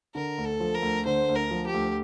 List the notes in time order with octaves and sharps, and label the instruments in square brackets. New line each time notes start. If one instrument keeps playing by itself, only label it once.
[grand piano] D3 [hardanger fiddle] A#4
[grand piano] D2
[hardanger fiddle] A4
[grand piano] F3
[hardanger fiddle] A#4
[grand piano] D2
[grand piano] D3 [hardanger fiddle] C5
[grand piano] D2
[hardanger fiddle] A#4
[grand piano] F3
[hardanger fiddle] G4
[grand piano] D2